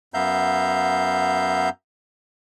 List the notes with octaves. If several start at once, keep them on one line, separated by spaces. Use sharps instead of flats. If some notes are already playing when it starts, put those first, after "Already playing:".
F#2 B3 E5 F5 A#5 G6